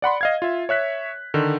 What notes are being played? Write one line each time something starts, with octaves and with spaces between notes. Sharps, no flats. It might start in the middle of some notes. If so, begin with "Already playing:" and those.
D5 F#5 B5 C6
D#5 F5 G#6
F4 E5
C#5 E5 F#6 B6
D3 D#3